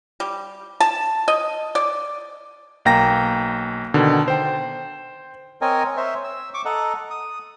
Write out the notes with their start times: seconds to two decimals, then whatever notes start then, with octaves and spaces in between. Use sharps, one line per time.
0.20 G3
0.80 A5
1.28 D#5
1.75 D5
2.85 B1 A#3 G5 A#5 A#6
3.94 B2 D3 D#3
4.28 C5 G5
5.62 C4 A#4 C#5 D#5 G#5
5.97 C5 C#5 E5
6.24 E6
6.54 C#6 D6
6.65 A4 D#5 F#5 A#5
7.10 D#6